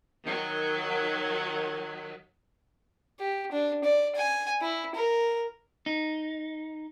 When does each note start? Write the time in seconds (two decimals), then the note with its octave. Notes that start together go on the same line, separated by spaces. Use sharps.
0.24 D#3 F#3
3.20 G4
3.52 D4
3.84 D5
4.15 G#5
4.61 E4
4.95 A#4
5.86 D#4